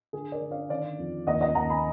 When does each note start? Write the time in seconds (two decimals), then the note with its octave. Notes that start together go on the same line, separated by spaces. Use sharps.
0.13 D3 G#4
0.32 A#4 D5
0.41 D3
0.51 D5 F5
0.69 D#3 D5 F5
0.99 F2
1.27 D#2 D#5 F#5
1.41 D#5 F#5
1.55 D#2 F#5 A#5
1.70 G#5 B5